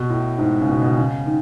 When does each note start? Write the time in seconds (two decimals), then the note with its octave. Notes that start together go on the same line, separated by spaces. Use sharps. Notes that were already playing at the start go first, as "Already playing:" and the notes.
Already playing: B2
0.10 A2
0.38 G#2
0.61 C#3
0.67 B2
0.82 B2
0.91 D#3
0.97 C#3
1.26 D#3